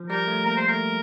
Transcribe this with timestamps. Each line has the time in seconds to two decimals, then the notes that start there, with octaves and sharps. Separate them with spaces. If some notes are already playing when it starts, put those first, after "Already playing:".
Already playing: F3
0.10 G3 A#4
0.27 A3
0.45 A#3 A#4
0.57 C5
0.68 A3 A#4